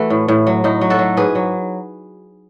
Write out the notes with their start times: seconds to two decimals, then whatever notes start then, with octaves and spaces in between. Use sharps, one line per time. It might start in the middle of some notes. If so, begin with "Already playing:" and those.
Already playing: E3 A3 F#4
0.10 A2
0.28 A2
0.47 F#3
0.64 A2 D#4
0.81 F#3
0.90 F#4 A4
0.99 F#3
1.17 G#2 G#4 B4
1.35 F#3